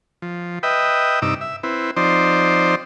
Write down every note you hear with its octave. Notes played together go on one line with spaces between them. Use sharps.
F3
B4 D#5 E5 G5
G2 C3 D#4 D6 E6
E5
C4 E4 B4
F3 C4 D#4 C5 D5